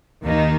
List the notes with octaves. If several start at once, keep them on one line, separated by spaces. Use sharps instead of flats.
D#2 D#3 A#3 D#4